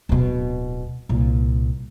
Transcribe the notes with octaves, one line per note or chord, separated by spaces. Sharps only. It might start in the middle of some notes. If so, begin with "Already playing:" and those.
D1 B2
C2 A#2